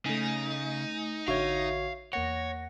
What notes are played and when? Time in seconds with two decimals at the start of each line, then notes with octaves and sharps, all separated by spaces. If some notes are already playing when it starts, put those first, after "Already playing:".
0.06 C#3 A3 D#4 G#5
1.28 A1 D3 F#4 C#5 E5 F5
2.13 E2 A#3 C#5 F#5 A#6